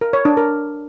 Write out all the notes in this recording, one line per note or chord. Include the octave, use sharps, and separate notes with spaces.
A#4
C#5
D4
A#4